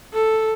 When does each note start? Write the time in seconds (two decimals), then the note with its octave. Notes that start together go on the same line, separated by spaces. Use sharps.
0.13 A4